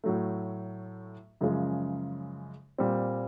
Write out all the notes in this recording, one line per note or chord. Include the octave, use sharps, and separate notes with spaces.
A2 F#3 A3
F#2 C#3 F3 G#3
A#2 G3 C4